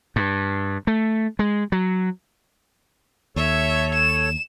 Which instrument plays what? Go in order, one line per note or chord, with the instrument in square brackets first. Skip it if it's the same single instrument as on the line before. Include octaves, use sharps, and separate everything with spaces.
[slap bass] G2
A3
G#3
F#3
[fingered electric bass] D#2 [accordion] A4 C#5 [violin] E5
[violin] E7